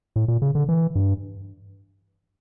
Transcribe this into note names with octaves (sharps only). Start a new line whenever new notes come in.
A2
A#2
C#3
D3
E3
G2